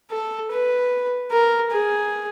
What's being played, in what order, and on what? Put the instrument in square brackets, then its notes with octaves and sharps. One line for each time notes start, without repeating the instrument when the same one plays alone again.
[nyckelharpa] A4
B4
A#4
G#4